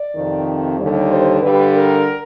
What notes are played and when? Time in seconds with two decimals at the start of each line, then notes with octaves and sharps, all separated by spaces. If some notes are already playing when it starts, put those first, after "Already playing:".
Already playing: D5
0.15 F2 C3 D#3
0.79 D#2 D3 G3
1.10 C5
1.42 G2 D3 G3 B4
1.75 A#4